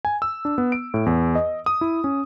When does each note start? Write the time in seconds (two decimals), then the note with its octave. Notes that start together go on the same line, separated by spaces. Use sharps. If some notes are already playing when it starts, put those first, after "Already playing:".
0.05 G#5
0.22 E6
0.45 D4
0.58 B3
0.72 D7
0.94 A2
1.06 E2
1.35 D#5
1.66 D#6
1.81 E4
2.04 C#4